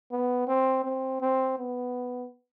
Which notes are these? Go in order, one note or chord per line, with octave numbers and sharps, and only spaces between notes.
B3
C4
C4
C4
B3